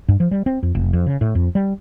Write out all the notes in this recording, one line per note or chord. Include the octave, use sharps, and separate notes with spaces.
G2
F3
G3
C4
F2
F1
F2
C#3
A2
F2
G3